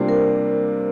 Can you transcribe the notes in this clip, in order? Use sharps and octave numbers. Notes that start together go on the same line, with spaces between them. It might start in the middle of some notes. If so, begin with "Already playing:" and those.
Already playing: C3 G3 A#3 D4 F4 C5
A#4